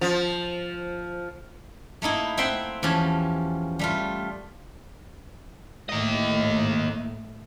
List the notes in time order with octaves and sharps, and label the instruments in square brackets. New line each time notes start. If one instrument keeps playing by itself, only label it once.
[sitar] F3
[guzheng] A3 A#3 D#4 E4
C4 E5 F#5 G5 C6
E2 F3 C#4 G4 A5
G3 A3 F4
[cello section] A2 [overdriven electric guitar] A#3 D#5